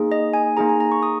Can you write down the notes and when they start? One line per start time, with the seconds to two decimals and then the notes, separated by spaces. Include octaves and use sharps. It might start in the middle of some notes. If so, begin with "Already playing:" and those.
Already playing: A#3 D#4 G#4
0.12 D#5
0.34 G#5
0.57 A#3 D#4 G#4 A#5
0.69 G#5
0.80 A#5
0.92 C#6
1.03 D#6